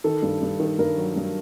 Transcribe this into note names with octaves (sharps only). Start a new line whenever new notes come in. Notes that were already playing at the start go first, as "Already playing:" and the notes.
D#3 A4
G2
G2
D#3
G2 A#4
F#3
G2